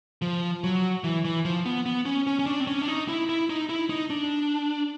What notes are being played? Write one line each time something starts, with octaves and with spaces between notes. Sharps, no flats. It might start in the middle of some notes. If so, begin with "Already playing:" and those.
F3
F#3
E3
E3
F3
B3
B3
C#4
C#4
C#4
D4
C4
C#4
D4
D#4
E4
E4
D#4
E4
D#4
D4